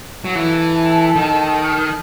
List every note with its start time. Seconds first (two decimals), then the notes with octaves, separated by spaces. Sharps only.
0.25 F#3
0.35 E3 A4
1.16 D#3